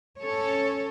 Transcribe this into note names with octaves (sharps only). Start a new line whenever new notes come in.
C#4 A4 C#5